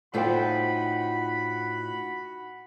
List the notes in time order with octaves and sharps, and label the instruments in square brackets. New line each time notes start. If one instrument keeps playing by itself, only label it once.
[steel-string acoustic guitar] A2 D#4 F4 [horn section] F#4 B5 [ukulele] A4 C5 G5